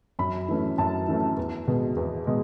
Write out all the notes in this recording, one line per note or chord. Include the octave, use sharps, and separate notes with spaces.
F#2 B5
E3 A3 C#4
F#2 A5
E3 A3 C#4
E2
B2 G#3
E2
B2 G#3